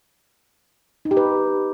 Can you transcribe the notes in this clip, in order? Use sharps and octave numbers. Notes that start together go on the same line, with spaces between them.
D#4
G4
B4